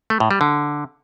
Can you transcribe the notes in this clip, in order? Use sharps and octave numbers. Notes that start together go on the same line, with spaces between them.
A3
A2
G3
D3